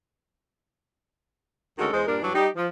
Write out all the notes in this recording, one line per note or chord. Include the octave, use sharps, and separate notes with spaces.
D2 D#3 G#3 C#4 F#4 A4
E2 G#3 C5
G2 A#2 D4 G4 A#4
G2 E3 F#3 D4
G3 D#4 G4
F3